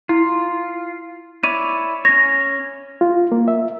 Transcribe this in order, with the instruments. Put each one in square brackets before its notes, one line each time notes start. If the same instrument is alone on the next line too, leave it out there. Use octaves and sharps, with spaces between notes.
[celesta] E4 [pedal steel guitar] F4
[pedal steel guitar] E4 C#5 D5 [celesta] D#7
[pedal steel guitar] C#4 C#5 [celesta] A#6
[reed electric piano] F4
A#3
E5